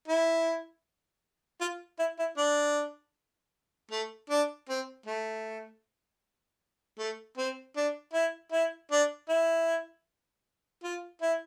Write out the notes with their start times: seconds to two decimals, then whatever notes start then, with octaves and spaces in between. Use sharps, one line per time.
0.08 E4
1.61 F4
1.99 E4
2.19 E4
2.38 D4
3.91 A3
4.30 D4
4.69 C4
5.06 A3
6.99 A3
7.38 C4
7.77 D4
8.14 E4
8.53 E4
8.92 D4
9.29 E4
10.84 F4
11.22 E4